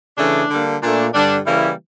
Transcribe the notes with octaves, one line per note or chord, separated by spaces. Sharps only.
C#3 E3 A3 D4
D3 G3 A#3
A#2 A3 D4
G2 D3 G3 D4
C#3 E3 G3 A#3 E4